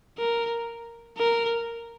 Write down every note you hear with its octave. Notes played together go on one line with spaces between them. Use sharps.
A#4
A#4